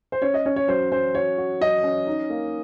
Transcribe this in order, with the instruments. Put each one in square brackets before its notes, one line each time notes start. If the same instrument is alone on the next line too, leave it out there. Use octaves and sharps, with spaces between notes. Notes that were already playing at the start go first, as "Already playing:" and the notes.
[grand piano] C5
[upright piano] C#4 [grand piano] C#5
[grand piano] D#5
[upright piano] C#4 [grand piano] C#5
[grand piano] C#5
[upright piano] F#3 [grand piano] C5
[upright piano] C#4 [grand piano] C5
[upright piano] F#4 [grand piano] C#5
[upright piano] F#4
[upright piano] F#3 [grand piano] D#5
[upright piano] C#4
D#4
A#3